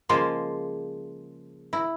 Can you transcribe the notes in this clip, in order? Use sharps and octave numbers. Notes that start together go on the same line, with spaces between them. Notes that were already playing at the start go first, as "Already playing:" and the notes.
C#3 F3 G#3 A#3 F4 C5
E4